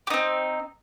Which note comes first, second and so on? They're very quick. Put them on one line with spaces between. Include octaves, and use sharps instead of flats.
G4 D#4 C4